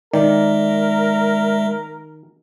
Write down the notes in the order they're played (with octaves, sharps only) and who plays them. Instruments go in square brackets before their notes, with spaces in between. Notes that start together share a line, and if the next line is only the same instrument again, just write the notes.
[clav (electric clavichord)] D#3 [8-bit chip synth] G#3 E5 [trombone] A#4 [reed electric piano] D5